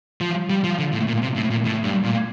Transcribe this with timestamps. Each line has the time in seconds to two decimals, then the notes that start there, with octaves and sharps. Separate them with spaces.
0.21 F3
0.50 G3
0.64 F3
0.79 D3
0.93 A2
1.07 A#2
1.22 C3
1.36 A2
1.50 A#2
1.65 A2
1.84 G2
2.04 A#2